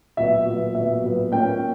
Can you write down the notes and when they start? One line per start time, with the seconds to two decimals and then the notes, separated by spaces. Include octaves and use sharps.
0.17 A#2 F#3 B3 E5
0.46 A#2 F#3 B3
0.75 A#2 F#3 B3 E5
1.03 A#2 F#3 B3
1.31 A#2 A#3 C#4 G5